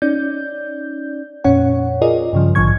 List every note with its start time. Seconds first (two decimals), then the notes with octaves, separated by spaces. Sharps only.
0.02 C#4 D#4 D5 G6
1.44 F2 A#2 C#4 C#5 F#5
2.02 F4 G#4 A#4 D5 D#5
2.33 G2 C#3 F3
2.55 A#1 G#2 D3 F3 C#6 G#6